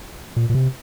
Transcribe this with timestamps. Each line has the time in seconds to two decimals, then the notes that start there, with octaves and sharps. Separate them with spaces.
0.36 A#2
0.50 A#2
0.55 C3